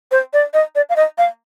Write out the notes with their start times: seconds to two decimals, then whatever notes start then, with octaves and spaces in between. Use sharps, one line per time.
0.12 C5
0.33 D5
0.54 D#5
0.75 D5
0.90 F5
0.96 D#5
1.18 F5